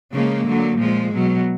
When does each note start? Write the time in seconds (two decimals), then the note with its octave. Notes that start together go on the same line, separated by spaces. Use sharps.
0.13 C#3 F3 G#3 A#3
0.46 D3 F#3
0.80 A#2 F3 G#3
1.13 B2 F#3